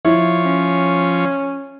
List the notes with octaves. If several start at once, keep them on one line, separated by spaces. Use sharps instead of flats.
F3 E4 C#5
C#4